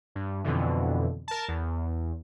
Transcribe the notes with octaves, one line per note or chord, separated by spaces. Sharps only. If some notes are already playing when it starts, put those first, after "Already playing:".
G2
F2 B2 D3 E3
A#4 A5
E2